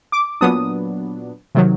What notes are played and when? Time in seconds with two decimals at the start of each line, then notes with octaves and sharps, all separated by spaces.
0.12 D6
0.41 A#2 F#3 B3 D4 D#6
1.55 C3 D#3 F#3